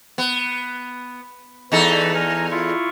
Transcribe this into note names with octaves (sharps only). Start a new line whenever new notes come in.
B3
E2 E3 D#4 A4 A5 B5
G#5 A#5 F6
E4 F4 C#6